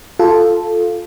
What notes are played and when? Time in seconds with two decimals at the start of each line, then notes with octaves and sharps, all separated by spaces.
0.19 F4 A4